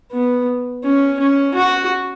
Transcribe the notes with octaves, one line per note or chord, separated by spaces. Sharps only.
B3
C#4
C#4
F#4